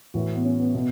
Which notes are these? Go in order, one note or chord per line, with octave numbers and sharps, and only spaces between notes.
A2 E3 F#4
B3
C#4
B3
B2 B3